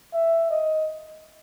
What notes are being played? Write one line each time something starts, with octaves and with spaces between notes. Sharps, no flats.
E5
D#5